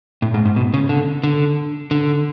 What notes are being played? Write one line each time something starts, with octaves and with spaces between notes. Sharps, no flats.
A2
G#2
G#2
B2
C#3
D3
D3
D3